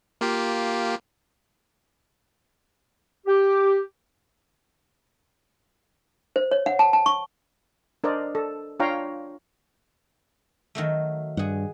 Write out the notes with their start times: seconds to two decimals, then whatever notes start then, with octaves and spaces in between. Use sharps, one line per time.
0.21 A#3 F4 G4
3.27 G4
6.36 C5
6.51 C#5
6.66 F#5
6.79 A5
6.93 A5
7.06 C#6
8.04 D4 A#4 C5 D5 D#5
8.35 A4
8.80 D4 F4 C#5 F5 G5 A#5
10.75 D#3 F#3 A3
11.37 G2 G#4 F#5